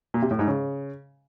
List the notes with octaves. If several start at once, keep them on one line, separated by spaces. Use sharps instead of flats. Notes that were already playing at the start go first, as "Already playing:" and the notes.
A#2
C3
A2
G#2
C#3